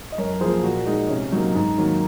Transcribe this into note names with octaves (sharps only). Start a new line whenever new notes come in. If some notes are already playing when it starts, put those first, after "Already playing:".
D#5
F#2 A#4 C#5
F3 A#3 G#4 C5
A#2 F#4 A#4
G#3 D#4
C3 C#4
F#3 A#3 D#4
G#2
D#3 F#3 A#3